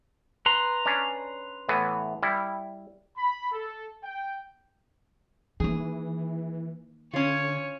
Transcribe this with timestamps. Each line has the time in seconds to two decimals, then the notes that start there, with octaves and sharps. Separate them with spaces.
0.46 B4 A#5 C6
0.86 C#4 D4
1.69 A2 E3 B3
2.23 G3 E4
3.17 B5
3.52 A4
4.04 G5
5.60 D#3 E3 A#3 G#4
7.13 D3 C#4 F4 C#5